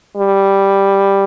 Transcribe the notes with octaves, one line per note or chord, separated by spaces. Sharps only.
G3